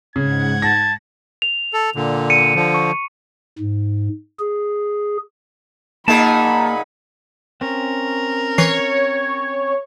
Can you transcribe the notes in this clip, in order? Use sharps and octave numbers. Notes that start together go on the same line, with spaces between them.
G#2 C#3 F#5 G#6
A5 A#6
F7
A4
A#2 D3
C#7 D#7
D3 F3
C#6
G#2
G#4
A#2 A#3 D#4 G#4 F#5 A5 B5
C4 C#4 A#4
E3 C#5 C7